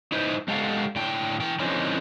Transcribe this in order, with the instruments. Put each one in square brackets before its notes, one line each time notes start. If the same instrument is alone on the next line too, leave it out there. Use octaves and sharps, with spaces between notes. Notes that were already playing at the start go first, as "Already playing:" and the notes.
[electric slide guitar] D#4 E4 B4 C5
G#3 G4 A4 F5 F#5
A2 D3 G5
E3 G5
D3 E3 F3 C4 C#4 D#4